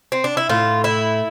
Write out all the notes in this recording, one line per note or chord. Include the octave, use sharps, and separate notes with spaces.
C4
D4
E4
A2 F4
E4